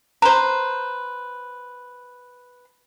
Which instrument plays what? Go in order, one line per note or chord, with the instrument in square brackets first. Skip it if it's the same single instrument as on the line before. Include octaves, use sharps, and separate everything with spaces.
[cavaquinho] B4 C5 [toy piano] A#5